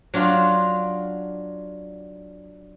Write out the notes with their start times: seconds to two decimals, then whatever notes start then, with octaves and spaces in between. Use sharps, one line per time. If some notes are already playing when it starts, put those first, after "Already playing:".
0.14 F#3 D4 F4